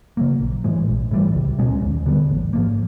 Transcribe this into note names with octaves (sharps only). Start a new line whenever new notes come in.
C#3 F#3 A#3
A#1
A2 E3 G#3
A#1
A2 E3 G3
C#2
B2 G#3 C#4
D#2
D3 G3 B3
A1
G#2 F3 A#3